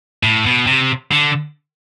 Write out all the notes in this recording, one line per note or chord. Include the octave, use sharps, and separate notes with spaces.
A2
B2
C3
D3